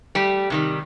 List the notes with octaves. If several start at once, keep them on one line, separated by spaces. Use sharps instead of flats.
G3 A3 G4
C3 D#3 G3